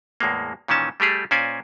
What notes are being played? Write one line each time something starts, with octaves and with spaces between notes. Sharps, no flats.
E2 A2 G#3 A#3
A#2 D#3 E3 C#4 A5
G3 A3 G4 G#4
A#2 C#4 C5 D5 G#5